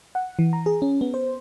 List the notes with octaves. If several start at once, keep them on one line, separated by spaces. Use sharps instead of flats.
F#5
E3
A#5
G#4
C#4
B3
C5